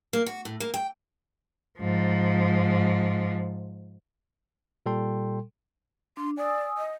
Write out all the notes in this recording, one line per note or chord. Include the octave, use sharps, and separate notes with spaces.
A#3
F#4
A2
A#3
G5
G#2 F3
A#2 G3 A4 G5 C6
D4 C6
D5 G#5 D#6 E6
D#5